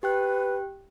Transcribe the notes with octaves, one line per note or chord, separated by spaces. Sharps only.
G4 B4 G5 F#6